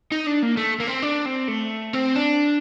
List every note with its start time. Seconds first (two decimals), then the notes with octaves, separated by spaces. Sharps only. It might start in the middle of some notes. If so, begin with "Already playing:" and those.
0.11 D#4
0.26 D4
0.42 A#3
0.57 A3
0.80 A#3
0.88 C4
1.02 D4
1.25 C4
1.48 A3
1.94 C4
2.16 D4